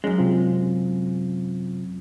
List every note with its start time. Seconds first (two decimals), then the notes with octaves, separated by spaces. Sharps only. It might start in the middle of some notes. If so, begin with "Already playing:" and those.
0.04 F#2 G#3 C#4
0.18 C3 C4 F4